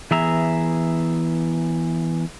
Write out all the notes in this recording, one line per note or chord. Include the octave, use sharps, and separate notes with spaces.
E3 B3 G#4 E5 A#5